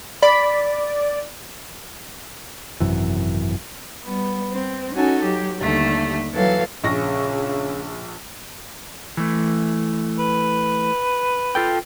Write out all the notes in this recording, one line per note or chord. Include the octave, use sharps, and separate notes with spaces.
D5 B5
G#1 F#2 C3 E3
G3 B3
C4
C#4 D#4 F#4 A4 G#5
F#3 G4
D#2 D3 G3 A3
E3 F#3 A4 F5 A6
A#1 C#3 C#6 A#6
E3 A3
B4
F4 A4 G5